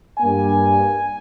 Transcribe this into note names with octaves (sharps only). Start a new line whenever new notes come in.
G2 G3 A#3 G#5